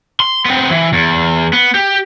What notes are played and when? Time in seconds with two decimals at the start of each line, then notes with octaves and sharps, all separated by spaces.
0.20 C6
0.45 B3 C4
0.70 E3
0.93 E2
1.53 B3
1.75 G4